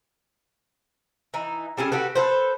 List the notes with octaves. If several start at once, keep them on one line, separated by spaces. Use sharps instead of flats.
E3 D#4
G3 C#4 G#4 A4
F#4 G4 A4 B4
A4 B4 C5